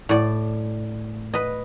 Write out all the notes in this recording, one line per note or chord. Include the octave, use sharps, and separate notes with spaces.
A2 D5
B4 D#5